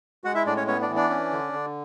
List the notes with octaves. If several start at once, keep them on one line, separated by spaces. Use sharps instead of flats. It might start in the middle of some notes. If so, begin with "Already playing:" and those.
G#3 F#4 F#5
E4 E5
A2 D4 D5
C#4 C#5
B3 C#4 C#5
D4 D5
E3
D4 D5
C#4
D3
D3